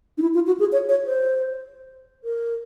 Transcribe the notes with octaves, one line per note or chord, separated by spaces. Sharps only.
D#4
E4
F4
F#4
G#4
C#5
C#5
C5
A#4